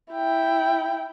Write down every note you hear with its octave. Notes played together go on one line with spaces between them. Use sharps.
E4 G5